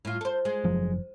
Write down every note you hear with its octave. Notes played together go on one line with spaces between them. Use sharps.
A2 F4
A4 C5
G#3
F#1 F3 F#3